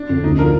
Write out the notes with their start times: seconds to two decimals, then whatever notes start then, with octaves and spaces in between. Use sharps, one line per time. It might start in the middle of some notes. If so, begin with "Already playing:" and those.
Already playing: D4
0.09 F2 D3
0.24 D2 D#4
0.39 D3 F3 A#4